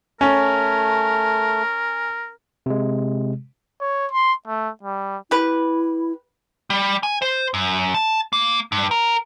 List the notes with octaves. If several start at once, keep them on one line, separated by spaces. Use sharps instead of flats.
A3 C#4 A#4
C3 G#3
C#5
C6
A3
G3
E4 G4 B4
G3
G#5
C5
F#2
A5
A#3
G2
A#4